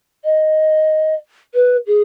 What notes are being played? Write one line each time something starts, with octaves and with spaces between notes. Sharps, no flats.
D#5
B4
G#4